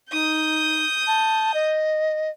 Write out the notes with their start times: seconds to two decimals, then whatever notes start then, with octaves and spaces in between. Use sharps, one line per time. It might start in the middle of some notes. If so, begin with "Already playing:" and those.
0.12 D#4 D#6 G6
1.07 A5
1.54 D#5